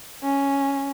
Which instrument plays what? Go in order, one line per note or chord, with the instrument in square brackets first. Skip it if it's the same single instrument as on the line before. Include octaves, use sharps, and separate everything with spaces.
[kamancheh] C#4